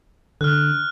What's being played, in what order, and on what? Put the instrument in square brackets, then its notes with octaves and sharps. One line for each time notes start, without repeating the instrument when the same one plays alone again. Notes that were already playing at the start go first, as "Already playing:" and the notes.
[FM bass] D3 [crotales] F6 F#6